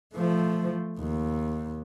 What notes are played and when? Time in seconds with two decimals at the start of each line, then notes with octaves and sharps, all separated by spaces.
0.15 F3 A3
1.00 D#2